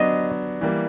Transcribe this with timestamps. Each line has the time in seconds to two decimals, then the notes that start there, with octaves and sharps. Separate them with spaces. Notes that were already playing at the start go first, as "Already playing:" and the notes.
Already playing: F#3 B3 D4 D#5
0.61 E3 G3 A#3